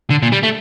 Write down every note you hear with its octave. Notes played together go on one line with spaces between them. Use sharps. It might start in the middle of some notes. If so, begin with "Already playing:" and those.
D3
A#2
G3
A3